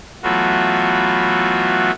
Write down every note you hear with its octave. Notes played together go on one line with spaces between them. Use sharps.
E3 F#3 A3 B3 F4 F#4